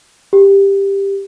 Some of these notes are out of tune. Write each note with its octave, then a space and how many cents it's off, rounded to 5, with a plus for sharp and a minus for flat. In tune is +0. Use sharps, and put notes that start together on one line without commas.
G4 +10